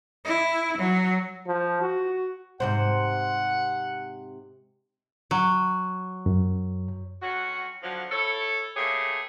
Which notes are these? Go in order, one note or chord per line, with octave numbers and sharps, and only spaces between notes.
E4
F#3
F3
F#4
G#2 C3 C5 F#5
F#3
F#2
F2 F#3 C#4 F#4
D3 F3 F#3
E4 A4 C#5
A3 A#3 E4 G4 G#4 C#5